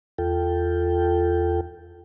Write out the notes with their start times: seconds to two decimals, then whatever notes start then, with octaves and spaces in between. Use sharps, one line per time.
0.18 E2 F4 A4 G5